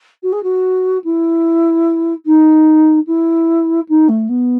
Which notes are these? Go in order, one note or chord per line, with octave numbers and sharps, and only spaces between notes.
F#4
G#4
F#4
E4
D#4
E4
D#4
A3
B3